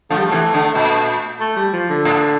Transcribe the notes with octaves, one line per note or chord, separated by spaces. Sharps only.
D3 F3 A3
G3
A3
C3 E3
D3
A#2
A3
G3
F3
D3
A2